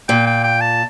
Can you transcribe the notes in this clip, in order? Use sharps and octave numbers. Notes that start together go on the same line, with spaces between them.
A#2 G5
G5
G5
A5